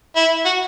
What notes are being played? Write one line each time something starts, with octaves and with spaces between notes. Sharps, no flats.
E4
F#4